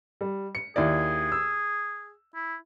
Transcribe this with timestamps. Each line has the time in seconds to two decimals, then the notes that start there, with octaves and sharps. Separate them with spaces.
0.21 G3
0.55 C#7
0.76 D#2 E4 G#4 D5
1.32 E6
2.35 E4